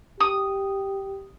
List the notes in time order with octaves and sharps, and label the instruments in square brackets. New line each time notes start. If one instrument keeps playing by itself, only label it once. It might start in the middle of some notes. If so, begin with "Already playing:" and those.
[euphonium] G4 [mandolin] D#6